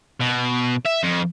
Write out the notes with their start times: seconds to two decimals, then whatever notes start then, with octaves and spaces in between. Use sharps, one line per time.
0.20 B2
0.85 E5
1.03 F2